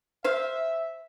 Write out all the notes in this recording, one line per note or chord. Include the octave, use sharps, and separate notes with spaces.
C5 E5 F5